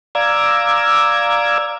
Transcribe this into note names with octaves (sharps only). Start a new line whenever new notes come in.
D5 F5 A#5 D6 E6 G#6